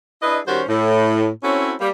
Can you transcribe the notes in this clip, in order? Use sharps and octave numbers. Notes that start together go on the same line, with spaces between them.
D4 E4 G#4 B4 D#5
D#3 G3 C#4 F#4 C5
A2
C4 C#4 E4 F#4 A4 C#5
G3 A#3